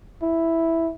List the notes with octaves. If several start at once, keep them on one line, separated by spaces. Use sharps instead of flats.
E4